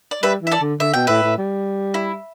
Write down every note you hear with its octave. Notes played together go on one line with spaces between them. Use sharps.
D5
G3 B4 E5
E3 E5
A4 D5
D3
D3 E5
B2 G5
A2 B4 E5
A2
G3
E4